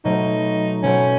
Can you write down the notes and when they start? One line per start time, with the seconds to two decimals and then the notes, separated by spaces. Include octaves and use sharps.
0.05 B2 F#3 A3 C4 D#4
0.83 B2 F#3 A3 C4 C#4